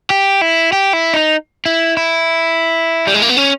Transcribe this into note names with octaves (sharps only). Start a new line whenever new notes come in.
G4
E4
G4
E4
D#4
E4
E4
G3
G#3
A#3
B3
C#4